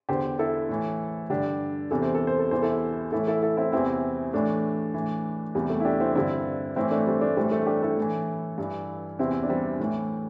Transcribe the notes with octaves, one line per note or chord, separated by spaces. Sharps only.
E2 D3 G4 C5
E4 A4
A2 E3
G2 D3 D4 G4
E2 C3 E3 A4
C5
A4
C5
A4
E2 C3 E3 C5
E4 A4
A2 E3 E4 A4
E4 A4
E4 A4
C4 E4
E2 C3 E3 C4 E4
A2 E3 A3 D4
A2 E3
E2 C3 E3 G3
A3
E4
D4 G4
C4 E4
G2 D3 C4 E4
A2 E3 C4 E4
A3 D4
G3 C4
A3 D4
A2 E3 G3 C4
A3
D4 G4
E4 A4
A2 E3
G2 E3
E2 C3 E3 C4 E4
D4
G3 C4
A2 E3